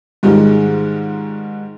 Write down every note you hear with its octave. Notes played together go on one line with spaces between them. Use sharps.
G#2 D#3 G3 G#3 F4